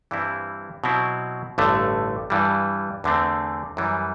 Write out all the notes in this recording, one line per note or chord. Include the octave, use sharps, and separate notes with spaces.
G2 E3 G3 C4 E4
B2 F#3 C4 E4
A1 G2 D3 A3
G2 E3 G3
E2 D3 A3 C4
F#2 E3 G3